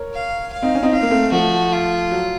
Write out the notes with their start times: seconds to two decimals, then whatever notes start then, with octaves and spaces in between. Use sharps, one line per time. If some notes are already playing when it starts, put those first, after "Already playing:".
Already playing: A#4 C#5
0.14 F5
0.53 F5
0.62 C4 D#4
0.75 C#4
0.83 C4 D#4
0.93 C4 F5
1.02 A#3
1.11 A3 C4
1.32 F3 A3 F#4
1.72 F4
2.11 F#3